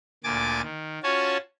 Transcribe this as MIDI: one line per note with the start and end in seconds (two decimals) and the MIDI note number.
0.24 0.61 38
0.24 0.61 46
0.24 0.61 80
0.24 0.61 86
0.24 0.61 93
0.64 0.99 51
1.03 1.37 61
1.03 1.37 65
1.03 1.37 66
1.03 1.37 73
1.03 1.37 80
1.03 1.37 81